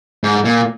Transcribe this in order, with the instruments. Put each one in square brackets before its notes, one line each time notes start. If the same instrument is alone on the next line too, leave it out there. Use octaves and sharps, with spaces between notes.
[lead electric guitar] G#2
A#2